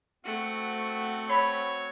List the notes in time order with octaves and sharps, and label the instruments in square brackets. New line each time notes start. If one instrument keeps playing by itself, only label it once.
[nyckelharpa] A3 F#5 [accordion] C4 F#4
[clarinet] C#5 [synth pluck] B5